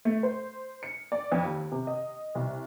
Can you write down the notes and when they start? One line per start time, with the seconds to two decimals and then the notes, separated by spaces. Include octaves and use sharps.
0.05 A3
0.23 C5
0.83 C#7
1.12 D5
1.32 F2
1.44 D#2
1.72 C3
1.87 D#5
2.35 C2